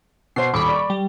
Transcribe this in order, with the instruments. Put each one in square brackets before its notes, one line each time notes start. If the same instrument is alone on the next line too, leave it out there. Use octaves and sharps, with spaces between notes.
[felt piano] B2 C5 [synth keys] C7
[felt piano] D#1 [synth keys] B5 C#6 D6
[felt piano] D5
[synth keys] G3